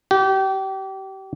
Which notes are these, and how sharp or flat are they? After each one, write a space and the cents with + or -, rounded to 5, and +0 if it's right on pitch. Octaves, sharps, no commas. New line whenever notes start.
G4 -30